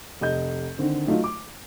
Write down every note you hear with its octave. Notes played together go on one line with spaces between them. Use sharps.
F1 D#5 G6
D3 D#3 C4
F#3 A3 D#4 F4
D6